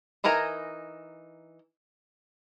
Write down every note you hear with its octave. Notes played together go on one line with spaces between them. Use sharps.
E3 D#4 A#4 G#5 A#5